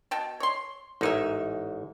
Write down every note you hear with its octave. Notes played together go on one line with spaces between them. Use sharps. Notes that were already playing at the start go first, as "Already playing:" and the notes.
B2 G5 A5
C#5 C6
A1 G#2 A#3 D#4 A#4 E5